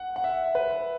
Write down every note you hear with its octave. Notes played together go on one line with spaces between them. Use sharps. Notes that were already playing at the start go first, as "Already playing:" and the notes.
Already playing: F#5
F#5
E5
B4